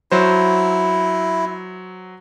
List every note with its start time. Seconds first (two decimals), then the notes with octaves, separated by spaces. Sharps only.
0.12 F#3 E4 C5